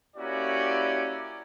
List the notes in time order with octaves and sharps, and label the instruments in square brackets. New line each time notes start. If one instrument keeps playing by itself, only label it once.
[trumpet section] A#3 C#4 E4 F#4 G4 D5